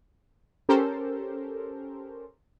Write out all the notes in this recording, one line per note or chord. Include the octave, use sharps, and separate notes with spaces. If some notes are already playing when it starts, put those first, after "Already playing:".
C#4 G4 A4 A#4 C5